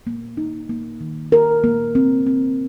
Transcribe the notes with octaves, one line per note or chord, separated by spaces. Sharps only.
A#3
D#4
A#3
D#3
A#4
A#3
C4
C4